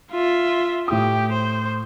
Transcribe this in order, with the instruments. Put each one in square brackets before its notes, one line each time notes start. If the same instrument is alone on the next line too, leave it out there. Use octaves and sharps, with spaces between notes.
[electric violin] F4 E5
[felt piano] A2 D#6 [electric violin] G4
[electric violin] C5